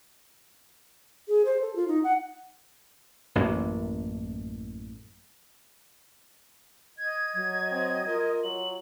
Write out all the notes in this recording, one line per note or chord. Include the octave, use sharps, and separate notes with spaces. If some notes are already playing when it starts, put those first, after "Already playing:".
G#4
C5
A4
F4
D#4
F#5
A1 F#2 A2 A#3
D#5 G#6
F#3
C4
F4 A#4
F#3 F#7